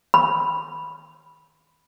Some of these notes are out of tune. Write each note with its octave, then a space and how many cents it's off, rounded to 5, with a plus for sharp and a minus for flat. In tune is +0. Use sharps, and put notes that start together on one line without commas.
B5 -10